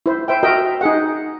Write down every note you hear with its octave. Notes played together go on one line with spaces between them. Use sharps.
E4 C5
C5 E5 G5
F#4 A#4 D#5 E5 G5
D#4 G#4 F#5